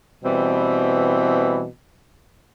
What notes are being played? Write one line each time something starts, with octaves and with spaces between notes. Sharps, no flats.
B2 E3 G3 C4